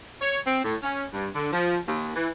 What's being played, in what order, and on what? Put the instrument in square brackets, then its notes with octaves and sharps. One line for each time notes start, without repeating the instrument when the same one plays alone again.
[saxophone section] C#5
C4
A2
C#4
G2
D3
F3
D#2
E3